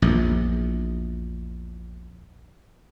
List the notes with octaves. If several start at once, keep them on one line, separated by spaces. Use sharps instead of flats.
A#1 E2